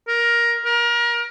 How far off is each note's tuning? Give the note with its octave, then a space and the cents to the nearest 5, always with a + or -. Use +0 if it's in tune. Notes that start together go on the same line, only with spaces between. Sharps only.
A#4 +15
A#4 +30